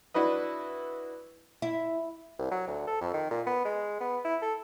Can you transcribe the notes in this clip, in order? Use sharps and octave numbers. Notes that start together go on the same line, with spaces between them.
D4 E4 F#4 B4 D#5
E4
C2
F#3
D2
A4
F2
D#3
A#2
B3
G#3
B3
E4
A4